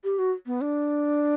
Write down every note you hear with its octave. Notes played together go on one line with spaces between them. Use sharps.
G4
F#4
B3
D4